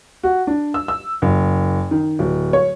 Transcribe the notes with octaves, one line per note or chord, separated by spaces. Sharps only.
F#4
D4
E6
E6
F#1
D#3
D1
C#5